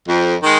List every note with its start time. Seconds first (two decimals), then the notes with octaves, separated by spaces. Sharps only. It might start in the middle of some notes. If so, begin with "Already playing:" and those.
0.08 F2
0.42 D#3 G#3